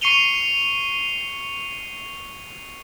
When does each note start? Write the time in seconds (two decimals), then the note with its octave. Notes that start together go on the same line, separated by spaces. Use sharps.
0.01 C#6 C7 C#7 D#7 F7 G7